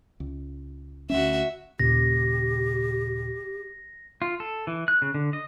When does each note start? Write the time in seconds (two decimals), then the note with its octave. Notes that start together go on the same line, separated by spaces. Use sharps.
0.20 C#2
1.10 D2 G#3 C#4 F#4 E5
1.79 D#2 A#2 C#3 G4 A#6
4.22 F4
4.40 A4
4.67 E3
4.88 F#6
5.02 C#3
5.14 D3
5.33 D#5